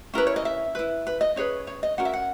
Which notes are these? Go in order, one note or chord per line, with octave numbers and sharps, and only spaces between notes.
C#4 E4 A#4 B4
C#5
D#5
E5
E4 B4
B4
D#5
C#4 G#4 B4 C#5
C#5
D#5
C#4 F#4 A#4 F#5
E5
F#5